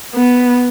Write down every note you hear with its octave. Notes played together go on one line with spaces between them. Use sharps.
B3